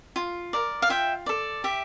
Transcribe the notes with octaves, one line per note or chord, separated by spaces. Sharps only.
F4
A#4 D5
F5
F4 E5 G5
A4 D5
G4 E5